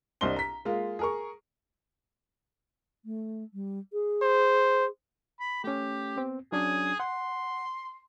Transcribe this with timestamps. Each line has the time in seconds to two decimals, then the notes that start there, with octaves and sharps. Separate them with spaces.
0.21 C2 D4 C5 D#5 C6 G7
0.36 A#5 B6
0.65 G#3 A#3 F4
0.99 G#4 A#4 C#6
3.05 A3
3.54 G3
3.93 G#4
4.22 C5
5.40 B5
5.64 A3 C#4 G4
6.16 B3 C4
6.52 F#3 C#4 D4 G#4
7.00 F#5 C6